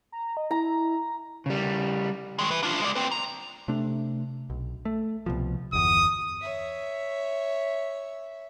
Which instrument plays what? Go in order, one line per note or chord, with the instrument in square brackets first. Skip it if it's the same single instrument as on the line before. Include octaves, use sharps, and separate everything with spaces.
[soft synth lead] A#5
D#5
[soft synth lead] E4 [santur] A#5
[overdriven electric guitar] C#3 G3
[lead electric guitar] D#3 G#3
E4 B4
D4 F4
G#3 D5
C4 B4
A#5
[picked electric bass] C3 A3 D4
B1
A3
C2 B2 F3
[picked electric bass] G1 E2 [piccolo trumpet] D#6
[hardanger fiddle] C#5 E5